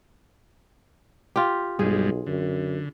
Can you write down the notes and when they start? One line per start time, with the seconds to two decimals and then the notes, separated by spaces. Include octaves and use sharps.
1.36 F4 G4
1.79 B1 G2 G3 G#3 G#4
2.26 F#2 D3